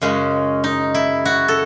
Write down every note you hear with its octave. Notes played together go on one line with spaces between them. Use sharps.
F#2 C#3 G#3 C#4
D#4
E4
F#4
A4